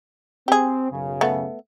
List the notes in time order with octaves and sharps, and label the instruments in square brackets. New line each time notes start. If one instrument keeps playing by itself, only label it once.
[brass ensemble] C4 [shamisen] G4 G#4
[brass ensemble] B1 F#2 C#3
[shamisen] A3 B3